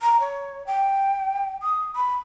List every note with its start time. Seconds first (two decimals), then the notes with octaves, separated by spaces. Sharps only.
0.01 A#5
0.20 C#5
0.67 G5
1.62 D#6
1.96 B5